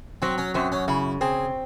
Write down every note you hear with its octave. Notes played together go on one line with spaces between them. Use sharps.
F#3 C4
C#4
F#2 C4
C#4
C#3 E4
C4 G#4